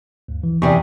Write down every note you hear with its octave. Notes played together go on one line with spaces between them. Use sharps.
D2 G2
E3
E2 C3 D5 G#5 C#6